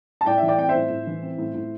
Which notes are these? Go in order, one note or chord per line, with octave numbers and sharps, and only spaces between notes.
A5
A2 D5 G5
E5
E3
D5 G5
C4 G5
C5 E5
A2
A2
E3
C4
A2
A2